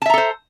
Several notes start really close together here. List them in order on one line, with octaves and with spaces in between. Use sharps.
A5 E5 A#5 A4 C5